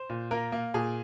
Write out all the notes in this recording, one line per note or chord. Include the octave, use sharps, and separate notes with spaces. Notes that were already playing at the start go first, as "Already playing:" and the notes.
Already playing: C5
A#2
A#3 A#4
A#3
A#2 G#4